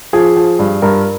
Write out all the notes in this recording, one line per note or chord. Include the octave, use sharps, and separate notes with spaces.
F3 G#4
F3
G2
G2 A#4